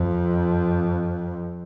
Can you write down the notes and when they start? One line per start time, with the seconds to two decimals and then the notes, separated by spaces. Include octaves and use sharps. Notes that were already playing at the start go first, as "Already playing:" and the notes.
Already playing: F2